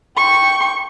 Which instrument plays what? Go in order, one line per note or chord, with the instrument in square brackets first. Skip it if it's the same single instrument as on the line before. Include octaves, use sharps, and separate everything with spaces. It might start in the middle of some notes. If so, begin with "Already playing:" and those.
[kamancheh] G5 C#6